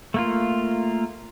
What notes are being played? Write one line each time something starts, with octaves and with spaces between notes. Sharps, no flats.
A3 A#3 F4